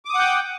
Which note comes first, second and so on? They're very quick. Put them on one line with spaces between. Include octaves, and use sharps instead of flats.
D6 D#6 F#5 G5